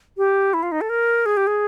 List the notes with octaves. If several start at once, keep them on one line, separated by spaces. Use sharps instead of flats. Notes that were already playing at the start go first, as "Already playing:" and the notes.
G4
E4
F4
D#4
A4
A#4
G#4
G4
G#4